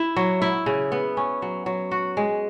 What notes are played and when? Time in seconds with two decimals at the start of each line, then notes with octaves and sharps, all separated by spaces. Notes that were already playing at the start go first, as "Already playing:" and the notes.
Already playing: E4
0.16 F#3
0.42 E4
0.66 C#3
0.92 B3
1.17 C#4
1.42 F#3
1.66 F#3
1.91 F#4
2.17 G#3